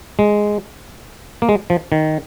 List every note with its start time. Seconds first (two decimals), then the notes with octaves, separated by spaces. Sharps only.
0.19 G#3
1.42 A#3
1.49 G#3
1.70 F3
1.92 D#3